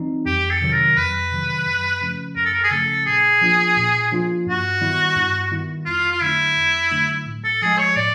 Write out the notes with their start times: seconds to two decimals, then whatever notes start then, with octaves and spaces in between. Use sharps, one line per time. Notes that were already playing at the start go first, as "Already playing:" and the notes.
Already playing: E3 G3 C4 D#4
0.26 F2 G4
0.50 A4
0.61 C3 D#3 F#3
0.72 A#4
0.96 F2 B4
1.31 C3 D#3 F#3
1.67 F#2
2.01 C#3 F3 A3 C#4
2.36 F#2 A#4
2.45 A4
2.53 A#4
2.64 G#4
2.71 C#3 F3 A3 C#4 A4
3.06 A#2 G#4
3.41 F3 A#3 D4 F4
3.76 A#2
4.12 F3 A#3 D4 F4
4.47 G2 F#4
4.81 D#3 G3 B3 E4
5.16 G2
5.51 D#3 G3 B3 E4
5.86 F2 F4
6.12 F4
6.21 D3 F#3 A3 D4 E4
6.56 F2
6.91 D3 F#3 A3 D4
7.26 A2
7.44 A4
7.62 F3 G#3 G#4
7.78 C#5
7.96 A2 D5